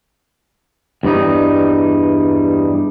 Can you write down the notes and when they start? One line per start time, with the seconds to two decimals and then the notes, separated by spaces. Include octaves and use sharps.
1.03 E2 G2 G3 D#4